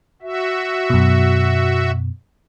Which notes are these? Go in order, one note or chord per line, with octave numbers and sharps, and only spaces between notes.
F#4 E5
F#2 B2